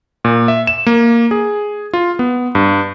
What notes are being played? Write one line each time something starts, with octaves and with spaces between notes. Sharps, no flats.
A#2
E5
E7
A#3
G#4
F4
B3
G2